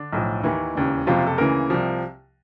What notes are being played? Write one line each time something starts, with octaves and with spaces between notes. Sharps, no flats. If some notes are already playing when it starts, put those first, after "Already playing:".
Already playing: D3 D4
B1 A2 F3
D#2 D#3 E3 E4
E1 D#2 C#3
F#1 F2 C3 F3 F4
A4
D2 C#3 E3 A#3 A#4
C2 C3 F3